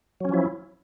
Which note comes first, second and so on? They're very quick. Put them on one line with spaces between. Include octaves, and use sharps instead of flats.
F#3 C#4 F3 E4